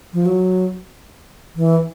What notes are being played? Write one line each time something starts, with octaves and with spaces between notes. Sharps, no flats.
F3
F#3
E3